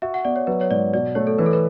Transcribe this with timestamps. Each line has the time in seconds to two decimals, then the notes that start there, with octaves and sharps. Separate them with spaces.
0.02 F#4 E5
0.14 F#5
0.25 B3 D5
0.36 C#5
0.47 F#3 B4
0.61 C#5
0.70 G#2 D5
0.93 B2 D5
1.15 A3 C#5
1.27 A4
1.38 E3 B4
1.46 A4
1.53 B4